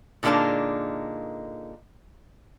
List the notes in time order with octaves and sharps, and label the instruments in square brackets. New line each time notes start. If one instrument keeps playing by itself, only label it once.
[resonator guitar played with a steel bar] A#2 D3 G#3 A#3 D4 D#4